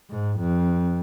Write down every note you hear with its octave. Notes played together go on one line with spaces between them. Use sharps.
G#2
F2